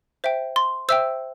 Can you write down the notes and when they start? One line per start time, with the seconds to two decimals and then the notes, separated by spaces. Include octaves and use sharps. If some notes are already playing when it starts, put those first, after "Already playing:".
0.24 C5 E5 G5
0.56 C6
0.89 C5 E5 G5 E6